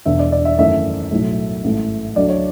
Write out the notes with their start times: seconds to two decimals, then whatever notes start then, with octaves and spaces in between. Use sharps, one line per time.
0.06 E1 E2 D3 E5
0.19 D5
0.32 D5
0.45 E5
0.58 G#1 F#2 E3 A3 E5
1.12 B1 A2 F#3 A3
1.64 A1 G#2 E3 A3
2.16 D2 D3 F#3 A3 D5
2.29 C#5